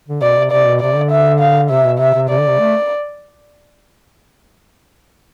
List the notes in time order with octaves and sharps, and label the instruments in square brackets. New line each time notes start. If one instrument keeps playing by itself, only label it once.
[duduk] D3
[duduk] B2 [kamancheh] D5
[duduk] C3
[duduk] C3 [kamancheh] D5
[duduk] B2
[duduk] C3 [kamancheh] D5
[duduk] D3
[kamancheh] E5
F5
[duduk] C3 [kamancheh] E5
[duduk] B2
[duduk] C3 [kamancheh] E5
[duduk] C3
[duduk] C3 [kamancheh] D5
[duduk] D3
C3
A3